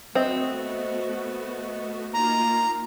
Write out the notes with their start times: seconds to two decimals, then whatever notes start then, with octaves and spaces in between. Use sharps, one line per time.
0.15 A3 B3 C4 F#4 D#5 E5
2.13 A#3 D#4 F4 A#5